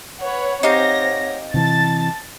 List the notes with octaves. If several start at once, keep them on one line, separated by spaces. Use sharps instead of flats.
B4 C#5 F#5
C4 D#4 G4 C#5 F5 F#5 A#6
C3 E3 A5 A6